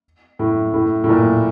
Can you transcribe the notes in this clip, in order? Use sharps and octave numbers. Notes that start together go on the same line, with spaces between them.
A2
A2
A2
A#2